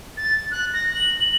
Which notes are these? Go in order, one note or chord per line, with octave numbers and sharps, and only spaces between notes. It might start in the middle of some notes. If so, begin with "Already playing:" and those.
A6
F#6
A#6
F#7
F#7